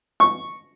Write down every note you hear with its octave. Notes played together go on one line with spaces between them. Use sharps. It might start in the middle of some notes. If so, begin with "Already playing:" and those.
C#6